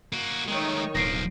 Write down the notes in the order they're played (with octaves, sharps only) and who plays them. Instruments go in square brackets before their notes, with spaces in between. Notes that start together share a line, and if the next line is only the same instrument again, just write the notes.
[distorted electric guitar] A#3 F#4
[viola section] D#3 D#4 C#5 [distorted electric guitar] G#3 A3
[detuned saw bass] D1 [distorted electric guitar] B1 F3 [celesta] A#6 C7 D7